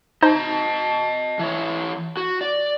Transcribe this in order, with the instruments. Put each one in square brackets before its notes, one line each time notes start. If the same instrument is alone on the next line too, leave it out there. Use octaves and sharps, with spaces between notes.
[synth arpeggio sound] D#4 C5 [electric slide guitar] D#5 A5
[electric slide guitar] E3 C#5
F#4
D5